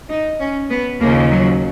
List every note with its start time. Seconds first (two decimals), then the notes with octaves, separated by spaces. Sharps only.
0.09 D#4
0.40 C#4
0.70 B3
1.00 D#2 C#3 F3 A#3
1.31 F#3